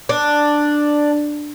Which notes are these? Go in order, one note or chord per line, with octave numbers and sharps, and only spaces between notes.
D4